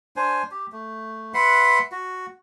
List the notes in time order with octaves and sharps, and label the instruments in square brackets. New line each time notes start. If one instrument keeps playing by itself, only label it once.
[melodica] D4 C5 G#5
G4
A3
B4 E5 F#5 C6
F#4